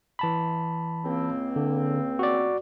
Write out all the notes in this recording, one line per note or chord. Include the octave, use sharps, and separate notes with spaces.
E3 A5 B5
C#2 A#3 C4
D3
F#4 D5